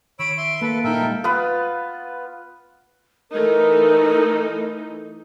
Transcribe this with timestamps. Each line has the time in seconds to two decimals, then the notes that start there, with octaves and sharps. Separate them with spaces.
0.19 D#3 C#5 B5 E6 D7
0.38 E5 C6
0.62 A#3 A4 B4 D7
0.84 A#2 D#4 A4 A#4 E5 G5
1.02 G3 G#3
1.24 B3 F4 B4
3.31 E3 A3 D#4 A#4